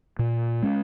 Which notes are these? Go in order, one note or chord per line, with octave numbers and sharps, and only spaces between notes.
A#2
G#3 C#4